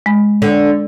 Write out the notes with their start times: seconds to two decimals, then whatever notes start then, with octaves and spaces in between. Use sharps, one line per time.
0.06 G#3 B5
0.42 D3